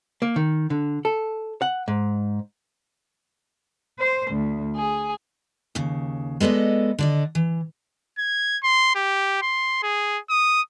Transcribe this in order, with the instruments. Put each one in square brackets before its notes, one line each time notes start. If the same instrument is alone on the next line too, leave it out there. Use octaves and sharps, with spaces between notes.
[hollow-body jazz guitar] A#3
D#3
D3
A4
F#5
G#2
[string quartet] C5
D2
G#4
[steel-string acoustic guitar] D#2 C#3
G#3 B3 A4 D5 D#5
D3 D5 D#5
E3
[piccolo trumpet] G#6
C6
G4
C6
G#4
D#6